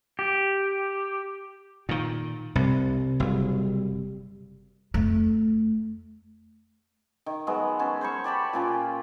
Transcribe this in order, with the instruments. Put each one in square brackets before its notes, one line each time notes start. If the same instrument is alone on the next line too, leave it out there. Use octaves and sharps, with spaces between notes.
[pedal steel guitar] G4
[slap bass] A#2 D#3
[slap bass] C2 [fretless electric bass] C3
[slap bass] F#1 [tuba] G3
[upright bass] F2 A3
[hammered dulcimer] D#3
F#3 G#3 B3
C#4 A5
C5 C#5 B5 C#6
G4 D5 A5 B5
A#2 C#4 F4